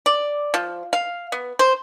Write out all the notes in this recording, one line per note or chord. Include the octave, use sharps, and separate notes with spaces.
D5
F3
F5
B3
C5